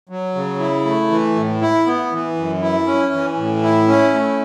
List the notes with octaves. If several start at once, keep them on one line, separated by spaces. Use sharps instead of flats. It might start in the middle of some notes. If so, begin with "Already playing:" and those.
F#3
C#3
E4
A3
E3
A2
E4
B3
E3
F#2
E4
C#4
E3
A2
E4
C#4
A3